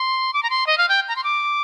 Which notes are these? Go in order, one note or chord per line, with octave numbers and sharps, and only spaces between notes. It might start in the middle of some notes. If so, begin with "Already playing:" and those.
Already playing: C6
D6
A#5
C6
D#5
F5
G5
A#5
C6
D6